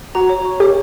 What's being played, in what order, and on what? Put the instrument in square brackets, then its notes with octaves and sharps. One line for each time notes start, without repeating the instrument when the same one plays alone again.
[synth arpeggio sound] F#4 [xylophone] A#5
[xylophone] C#5
C#6
[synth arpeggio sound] G4 [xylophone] C#5